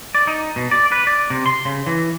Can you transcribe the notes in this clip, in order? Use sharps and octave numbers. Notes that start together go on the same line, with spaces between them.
D5
D#4
B2
D5
B4
D5
C3
C6
C#3
E3